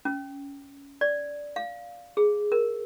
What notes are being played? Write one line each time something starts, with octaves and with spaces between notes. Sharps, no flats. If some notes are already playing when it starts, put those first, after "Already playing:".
C#4
D5
F5
G#4
A#4